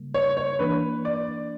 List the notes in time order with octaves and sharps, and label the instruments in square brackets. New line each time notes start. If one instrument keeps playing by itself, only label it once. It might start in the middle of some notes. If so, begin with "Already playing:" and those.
Already playing: [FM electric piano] C#3 G3 A#3
[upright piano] C#5
C#5
[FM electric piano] E3 A#3 D4 [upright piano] B4
[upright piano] D5